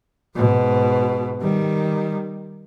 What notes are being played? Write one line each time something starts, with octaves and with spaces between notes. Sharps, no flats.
G#2 B2
D#3 G3